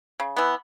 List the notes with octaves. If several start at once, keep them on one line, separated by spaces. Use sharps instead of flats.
C#3
E3 B3